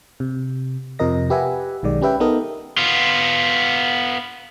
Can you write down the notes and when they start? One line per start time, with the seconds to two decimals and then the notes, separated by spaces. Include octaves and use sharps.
0.20 C3
0.99 F2 C3 F3 A#4 D#5 A#6
1.30 G4 B4 E5 F#5 G#5
1.83 B1 D#3 G#3 D5
2.01 C#4 G4 B4 E5 G5
2.20 B3 D#4 A4 A#4 D#5
2.78 B3 F4